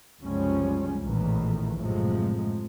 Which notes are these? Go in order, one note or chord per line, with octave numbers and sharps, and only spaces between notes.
F#1 C2 F3 G3 G#3 C#4
A#1 E2 A2 D#3 E3
F#2 A2 C3 F3 G#3